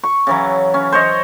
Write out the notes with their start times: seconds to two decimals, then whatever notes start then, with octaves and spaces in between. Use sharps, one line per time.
0.03 C#6
0.27 C#3 E3 F#3
0.74 C#4
0.92 C5 C#5 D#5